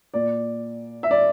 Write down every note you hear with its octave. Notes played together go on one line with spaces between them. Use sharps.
A#2 D5
E5
D5